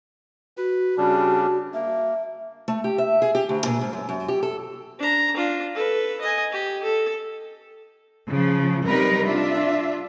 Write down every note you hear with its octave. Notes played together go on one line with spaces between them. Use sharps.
F#4 B4
C#3 G3 D4
A#3 E5
A3
G4
E5
G#4
G4
D2
A#2
G#2
F#2
F#2
G4
A4
D4 A#5
D4 F4
A4 B4
D#5 G#5
G4
A4
C#3 F3
C3 G3 D#4 A#4 B4
D4 F4 E5